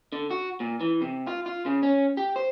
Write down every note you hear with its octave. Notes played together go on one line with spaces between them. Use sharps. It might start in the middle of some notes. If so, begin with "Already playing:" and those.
D3
F#4
A#2
E3
C3
F4
F4
C#3
C#4
G4
C5